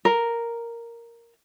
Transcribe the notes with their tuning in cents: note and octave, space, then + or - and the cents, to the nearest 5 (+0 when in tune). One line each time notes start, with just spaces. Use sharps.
A#4 +0